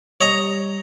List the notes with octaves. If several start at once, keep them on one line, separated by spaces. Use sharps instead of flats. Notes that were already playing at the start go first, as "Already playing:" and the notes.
G3 C#5 D#5 A#5